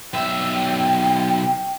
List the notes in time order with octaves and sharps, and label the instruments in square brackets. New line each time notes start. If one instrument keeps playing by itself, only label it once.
[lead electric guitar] B1 E5 [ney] G5